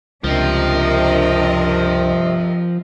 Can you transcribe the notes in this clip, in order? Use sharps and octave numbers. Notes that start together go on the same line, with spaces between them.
C#2 G2 C3 F3 C4 D4 A#4 D#5